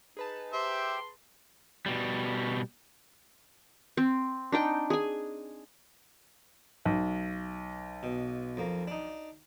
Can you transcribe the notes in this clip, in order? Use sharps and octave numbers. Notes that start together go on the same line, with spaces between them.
D#4 G#4 B4 A5
G4 C5 E5 G5 C6
B2 G3
C4
D4 D#4 G5
G#4 G#5
B1
B2
F2 A#3
D4 D#4